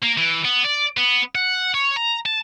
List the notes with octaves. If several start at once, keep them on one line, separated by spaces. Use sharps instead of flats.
A#3
E3
B3
D5
B3
F#5
C#5
A#5
A5